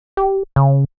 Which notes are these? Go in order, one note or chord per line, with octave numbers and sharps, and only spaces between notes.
G4
C#3